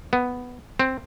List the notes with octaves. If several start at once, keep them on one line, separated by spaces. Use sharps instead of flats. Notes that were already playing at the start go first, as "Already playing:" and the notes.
B3
C4